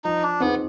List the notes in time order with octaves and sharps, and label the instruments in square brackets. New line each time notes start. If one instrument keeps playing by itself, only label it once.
[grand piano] F3 [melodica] D#4
[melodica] D4
[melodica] B3 [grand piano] C4 D#4 G#4